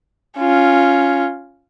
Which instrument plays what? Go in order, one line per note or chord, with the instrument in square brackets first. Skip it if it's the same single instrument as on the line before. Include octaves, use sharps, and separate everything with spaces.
[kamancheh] C#4 F4